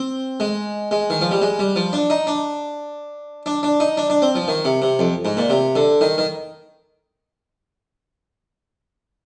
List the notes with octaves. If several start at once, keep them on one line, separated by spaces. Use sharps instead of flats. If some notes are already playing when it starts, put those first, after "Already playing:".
Already playing: C4
G#3
G#3
D#3
F3
G3
G#3
G3
F3
D4
D#4
D4
D4
D4
D#4
D4
D4
C4
F3
D#3
C3
C3
F2
G#2
A#2
C3
D3
D#3
D#3